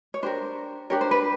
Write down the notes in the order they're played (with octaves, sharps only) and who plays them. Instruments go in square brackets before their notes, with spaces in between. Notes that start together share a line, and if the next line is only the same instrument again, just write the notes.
[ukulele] C#5
D4 G4 A#4 C5
D4 G4 A#4 C#5
C5
B4